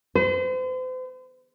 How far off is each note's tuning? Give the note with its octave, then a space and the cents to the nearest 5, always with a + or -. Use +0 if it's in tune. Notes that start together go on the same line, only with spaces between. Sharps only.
C5 -40